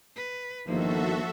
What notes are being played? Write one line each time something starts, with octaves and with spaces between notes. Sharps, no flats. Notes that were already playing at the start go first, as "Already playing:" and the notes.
B4
G1 D#3 F3 A#3 F#4 A4 E5